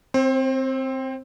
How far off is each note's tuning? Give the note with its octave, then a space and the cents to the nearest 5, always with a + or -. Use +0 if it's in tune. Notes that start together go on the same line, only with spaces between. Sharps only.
C4 +0 C5 +30